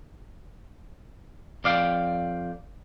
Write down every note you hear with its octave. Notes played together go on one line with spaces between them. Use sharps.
F2 D5 F5 G5